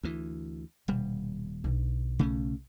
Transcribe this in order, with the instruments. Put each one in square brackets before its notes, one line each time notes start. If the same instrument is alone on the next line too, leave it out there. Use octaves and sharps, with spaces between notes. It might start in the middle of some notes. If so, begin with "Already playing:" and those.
[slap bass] D2 E3
[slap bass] D#1 G3 [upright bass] B2 D3
[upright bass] B1 D3
[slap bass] C#3 A3 C#4